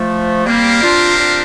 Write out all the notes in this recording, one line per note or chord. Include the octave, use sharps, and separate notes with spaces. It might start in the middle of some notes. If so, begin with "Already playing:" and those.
Already playing: F3 A3
G3 A#3 C4 G4 A#4 F5
D4 F4
D4 F4